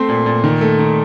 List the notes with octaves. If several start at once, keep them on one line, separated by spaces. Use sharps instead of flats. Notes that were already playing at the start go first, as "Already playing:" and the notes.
Already playing: A3 C4 C6
A#2
A#2
D#3
A3
D#3